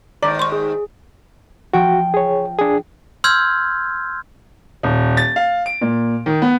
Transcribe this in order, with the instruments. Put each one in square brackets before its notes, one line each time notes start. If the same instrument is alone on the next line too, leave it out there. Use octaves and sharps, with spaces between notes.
[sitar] D#2 G#2 D#3 [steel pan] D5 [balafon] A#5
[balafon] C6 C#6
[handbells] G#4
[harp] F3 G5 [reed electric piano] F#4
[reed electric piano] G#4 C#5
D4 G#4
[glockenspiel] C6 E6 F6 G6 G#6
[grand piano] D#1
A6
F5
D7
A#2
D#3
B3